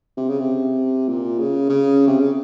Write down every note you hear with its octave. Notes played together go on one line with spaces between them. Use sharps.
C3
C#3
C3
A#2
C#3
C#3
C3
C#3